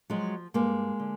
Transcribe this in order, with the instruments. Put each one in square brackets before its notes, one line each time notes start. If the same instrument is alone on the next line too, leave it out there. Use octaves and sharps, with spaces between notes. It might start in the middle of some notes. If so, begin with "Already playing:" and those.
[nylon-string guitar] F3 F#3 G#3
G2 G#3 A#3
D3